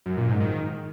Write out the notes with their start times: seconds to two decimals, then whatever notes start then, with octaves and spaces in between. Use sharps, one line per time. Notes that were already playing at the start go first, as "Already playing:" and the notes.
0.06 F#2
0.17 A#2
0.29 G#2
0.40 D#3